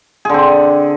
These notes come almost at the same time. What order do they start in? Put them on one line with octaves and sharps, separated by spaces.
G#4 D3 C4